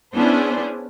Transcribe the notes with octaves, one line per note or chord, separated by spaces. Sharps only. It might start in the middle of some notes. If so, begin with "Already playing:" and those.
B3 C#4 D4 E4 G#4 C5